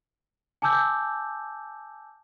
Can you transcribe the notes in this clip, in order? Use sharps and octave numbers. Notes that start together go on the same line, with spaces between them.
G#5 A5 D6 E6 G6